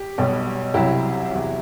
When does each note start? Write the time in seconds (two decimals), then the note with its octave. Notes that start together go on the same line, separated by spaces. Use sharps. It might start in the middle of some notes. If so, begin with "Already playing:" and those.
Already playing: G4
0.18 B1 B2 G3
0.74 C2 C3 F#3 E4 G4
1.31 E2 C3 F#3